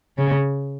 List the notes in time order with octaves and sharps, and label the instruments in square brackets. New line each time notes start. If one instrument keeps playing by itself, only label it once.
[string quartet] C#3